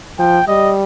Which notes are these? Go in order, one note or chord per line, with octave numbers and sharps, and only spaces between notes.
F3 G5
G3 D#5